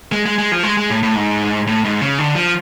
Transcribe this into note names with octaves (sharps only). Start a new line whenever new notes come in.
G#3
G#3
G#3
F3
G#3
G#3
A2
A2
G#2
A2
G#2
C#3
D3
F3